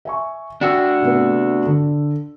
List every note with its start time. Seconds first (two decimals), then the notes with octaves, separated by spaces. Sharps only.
0.05 E5 G#5 C#6
0.61 D4 F#4 G5 E6
1.02 C3 A3 B3
1.67 D3